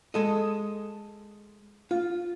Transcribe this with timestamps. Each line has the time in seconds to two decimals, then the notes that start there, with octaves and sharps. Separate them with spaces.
0.14 G#3 A4 D#5
1.91 F4